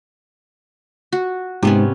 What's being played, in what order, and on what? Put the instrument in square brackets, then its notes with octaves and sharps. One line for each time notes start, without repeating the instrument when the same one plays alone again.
[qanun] F#4
[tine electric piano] G#2 [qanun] C3 B3 C#4